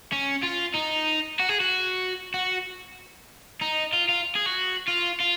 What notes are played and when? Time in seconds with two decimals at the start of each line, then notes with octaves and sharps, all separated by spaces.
0.12 C#4
0.44 F4
0.75 D#4
1.39 F#4
1.49 G#4
1.60 F#4
2.34 F#4
3.61 D#4
3.93 F4
4.09 F4
4.35 G#4
4.46 F#4
4.88 F4
5.20 F4